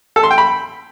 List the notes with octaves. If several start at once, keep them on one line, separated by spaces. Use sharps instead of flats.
A4
C6
G5
B5